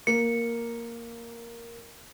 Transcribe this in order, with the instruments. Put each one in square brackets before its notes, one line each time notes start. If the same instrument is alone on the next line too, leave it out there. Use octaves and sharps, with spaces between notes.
[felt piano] A#3 [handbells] C#7